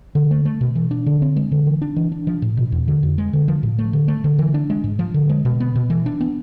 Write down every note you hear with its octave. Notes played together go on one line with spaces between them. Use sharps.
D3
A3
A3
B2
E3
D4
D3
C4
G#3
D3
E3
D4
E3
D4
F3
A2
B2
E2
D3
F2
G#3
D3
F3
A2
A3
D3
A3
D3
E3
D4
G#3
G#2
F3
D3
G#3
B2
B3
B2
E3
D4
B3